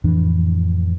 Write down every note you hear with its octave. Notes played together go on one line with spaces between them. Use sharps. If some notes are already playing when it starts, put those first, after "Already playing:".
F2 A2 E3 D4